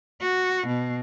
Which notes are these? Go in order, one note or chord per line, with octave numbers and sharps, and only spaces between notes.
F#4
B2